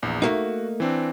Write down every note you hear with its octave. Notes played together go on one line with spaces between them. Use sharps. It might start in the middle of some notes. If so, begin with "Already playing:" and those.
A#1 E2
A3 A#3 D#4 F#4
E3 C4 D4